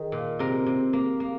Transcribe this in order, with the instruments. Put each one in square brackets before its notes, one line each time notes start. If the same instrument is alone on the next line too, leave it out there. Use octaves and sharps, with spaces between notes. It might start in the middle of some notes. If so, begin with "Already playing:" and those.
Already playing: [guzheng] D#3 G#4
A#2
C3 A#4
C3
A#3
A#3